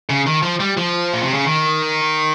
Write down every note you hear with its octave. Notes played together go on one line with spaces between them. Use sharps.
C#3
D#3
F3
G3
F3
A#2
C3
C#3
D#3